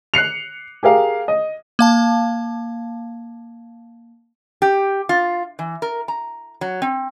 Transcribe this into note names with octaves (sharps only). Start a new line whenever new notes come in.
F#6 C7 C#7 F7
G4 G#4 A#4 F5
D#5
A#3 F5 A5
G4
F4
E3
A#4
A#5
F#3
C4